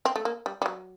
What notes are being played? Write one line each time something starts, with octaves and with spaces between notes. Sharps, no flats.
C4
A3
A#3
G3
G3
F#3